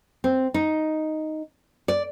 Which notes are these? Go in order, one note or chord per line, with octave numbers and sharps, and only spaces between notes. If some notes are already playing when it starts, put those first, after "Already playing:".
C4
D#4
D5